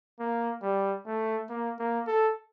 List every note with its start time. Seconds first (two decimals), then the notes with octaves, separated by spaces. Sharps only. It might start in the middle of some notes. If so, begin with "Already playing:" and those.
0.20 A#3
0.62 G3
1.06 A3
1.49 A#3
1.79 A#3
2.07 A4